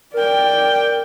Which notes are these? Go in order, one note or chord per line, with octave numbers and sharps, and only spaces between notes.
A#4 D5 G5